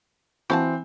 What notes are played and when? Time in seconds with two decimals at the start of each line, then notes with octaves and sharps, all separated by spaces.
0.50 E3 C4 F#4 F5 A5